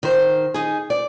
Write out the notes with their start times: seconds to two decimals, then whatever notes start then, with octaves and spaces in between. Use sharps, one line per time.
0.03 D#3 C5
0.54 D#4 G#4
0.90 D5